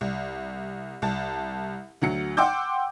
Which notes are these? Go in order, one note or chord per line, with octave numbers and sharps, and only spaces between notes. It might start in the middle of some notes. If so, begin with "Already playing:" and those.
C2
C2 A5
D2 F#3 C#7
F#5 G5 C6 D6 E6 G6